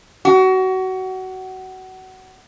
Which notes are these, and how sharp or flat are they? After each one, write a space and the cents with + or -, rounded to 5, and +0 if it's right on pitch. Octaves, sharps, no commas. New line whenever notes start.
F#4 +25